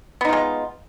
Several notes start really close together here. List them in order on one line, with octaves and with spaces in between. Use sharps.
B3 D#4 F4 G#3